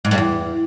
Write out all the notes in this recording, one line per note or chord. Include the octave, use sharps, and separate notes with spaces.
G#2
G2
E2